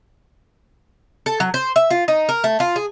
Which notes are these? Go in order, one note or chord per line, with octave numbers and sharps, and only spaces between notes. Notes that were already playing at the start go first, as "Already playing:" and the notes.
A4
F#3
C5
E5
F4
D#4
A#4
A3
F4
G#4